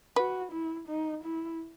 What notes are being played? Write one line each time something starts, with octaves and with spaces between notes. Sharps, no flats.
F#4 B4
E4
D#4
E4